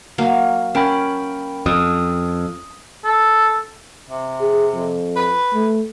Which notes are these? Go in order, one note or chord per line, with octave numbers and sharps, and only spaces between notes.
F#3 A#3 F5
C#4 A#4 G5 B5
F2 D#6
A4
C3
G#4
F2
B4
A3